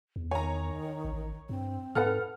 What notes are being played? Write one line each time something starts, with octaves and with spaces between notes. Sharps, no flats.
E2
D#3 C#5 G#5 A#5
A1
G2 C4
G#2 A4 B4 F#5 F6